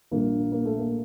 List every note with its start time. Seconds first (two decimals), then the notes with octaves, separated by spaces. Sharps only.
0.11 A#1 A#2 G3 A#3
0.52 A#3
0.65 A3
0.78 A#3